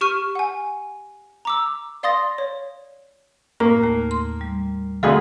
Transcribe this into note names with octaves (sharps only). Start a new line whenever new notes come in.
G4 C#6 F6 D#7
F#5 G#5
A#5 D6 E6
D5 F5 C6 D#6 A6 A#6
C#5
A2 A#3 A#5
D#2 A3
C6
G3
D2 C4 F#4 G#4 A4